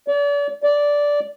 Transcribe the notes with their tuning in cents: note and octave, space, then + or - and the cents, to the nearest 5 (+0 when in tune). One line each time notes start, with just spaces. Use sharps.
D5 -40
D5 -10